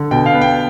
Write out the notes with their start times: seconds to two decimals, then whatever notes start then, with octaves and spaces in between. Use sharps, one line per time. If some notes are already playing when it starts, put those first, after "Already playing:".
Already playing: D3
0.11 B2 G5
0.26 F5
0.34 B3
0.41 G5